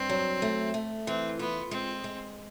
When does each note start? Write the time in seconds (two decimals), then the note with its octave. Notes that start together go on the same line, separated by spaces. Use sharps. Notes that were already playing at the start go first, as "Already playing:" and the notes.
Already playing: G2 C4
0.09 F#3
0.42 A3
0.74 A3
1.07 E3 C4
1.39 B3 F4
1.71 G#3 C4
2.04 G#3